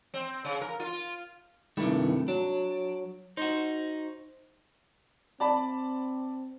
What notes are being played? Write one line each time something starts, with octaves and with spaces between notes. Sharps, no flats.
C4
C#3
A#4
F4
G2 C3 D#3 A3 E4
F#3 D4
D#4 F#4 C5
C4 D5 A5 B5